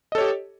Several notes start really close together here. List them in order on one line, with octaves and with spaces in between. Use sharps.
D#5 A4 C#5 G4